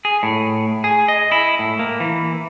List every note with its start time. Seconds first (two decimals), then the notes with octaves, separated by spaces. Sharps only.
0.05 G#4
0.23 A2
0.84 G#4
1.08 D#5
1.32 E4
1.59 A2
1.79 A#3
2.00 E3